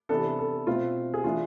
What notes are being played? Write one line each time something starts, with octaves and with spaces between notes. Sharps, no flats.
C3 E3 B3 D4 A4
A4
B2 A3 C4 F4
G#4
E3 A3 D4 F4